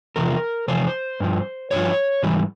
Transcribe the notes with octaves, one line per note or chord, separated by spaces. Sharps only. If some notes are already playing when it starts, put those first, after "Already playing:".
E2 C3 F3 A#4
E2 C3 F3 C5
G2 F3
G2 F3 C#5
G#2 E3 G3